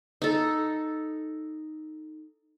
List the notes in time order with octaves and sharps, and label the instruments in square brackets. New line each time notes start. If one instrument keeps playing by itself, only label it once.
[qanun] D#4 A4